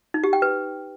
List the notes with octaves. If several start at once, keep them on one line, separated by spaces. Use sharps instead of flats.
D#4
G4
G5
B4